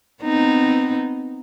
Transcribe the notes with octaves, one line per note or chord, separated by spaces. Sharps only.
B3 C4 D#4